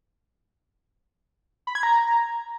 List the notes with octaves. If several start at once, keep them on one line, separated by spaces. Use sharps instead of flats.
B5
G#6
A#5